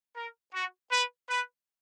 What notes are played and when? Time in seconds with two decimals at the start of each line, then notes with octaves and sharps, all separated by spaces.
0.15 A#4
0.53 F#4
0.91 B4
1.28 B4